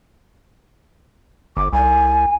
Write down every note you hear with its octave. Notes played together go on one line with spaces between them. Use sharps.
G1 D6
C2 G#5